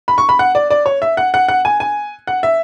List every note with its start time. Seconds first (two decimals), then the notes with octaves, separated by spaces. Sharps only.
0.08 B5
0.18 C#6
0.29 B5
0.39 F#5
0.55 D5
0.70 D5
0.86 C#5
1.02 E5
1.17 F#5
1.34 F#5
1.48 F#5
1.65 G#5
1.80 G#5
2.27 F#5
2.43 E5